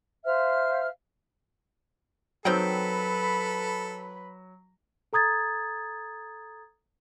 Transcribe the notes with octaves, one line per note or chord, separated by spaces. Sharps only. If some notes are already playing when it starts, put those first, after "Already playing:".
C5 E5 F5 F6
D#3 F#3 C4 A4 B4 G5 B5
A4 A#5 D#6 G#6 A6